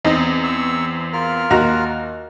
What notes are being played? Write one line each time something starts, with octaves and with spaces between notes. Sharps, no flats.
E2 C4 D#4
C#6 E6
F4 A#4 F6
D#2 F#4 A#5